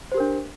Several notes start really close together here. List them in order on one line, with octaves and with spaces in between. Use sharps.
C5 G4 A#4 D4